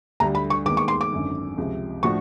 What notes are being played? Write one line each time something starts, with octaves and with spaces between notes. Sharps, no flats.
D2 D3 G3 A#5
B5
C#6
D#2 D#3 G#3 B3 D6
C#6
C6
D6
G#1 F#2 D3
C#2 C3 F3
A2 F3 A3 D4 F#4 C#6